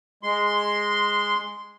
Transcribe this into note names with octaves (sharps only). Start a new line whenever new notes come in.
G#3 C6